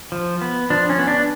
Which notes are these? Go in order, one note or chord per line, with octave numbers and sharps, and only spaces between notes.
F3
B3
F3 D4
C#4
B3
D4